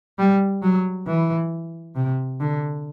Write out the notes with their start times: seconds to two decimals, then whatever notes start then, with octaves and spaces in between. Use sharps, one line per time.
0.18 G3
0.63 F#3
1.07 E3
1.96 C3
2.40 D3